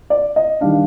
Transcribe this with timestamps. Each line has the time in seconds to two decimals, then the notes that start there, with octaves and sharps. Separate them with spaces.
0.10 D5
0.36 D#5
0.61 D#3 G3 D4 F5